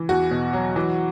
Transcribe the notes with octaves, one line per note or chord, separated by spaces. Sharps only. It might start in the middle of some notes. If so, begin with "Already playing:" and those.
Already playing: E3
E2 F#4
B2
F#3
E3